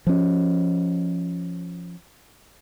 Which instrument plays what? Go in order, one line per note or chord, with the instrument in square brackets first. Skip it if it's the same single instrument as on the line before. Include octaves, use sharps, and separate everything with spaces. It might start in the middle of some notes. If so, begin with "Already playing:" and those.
[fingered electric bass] F3 C#4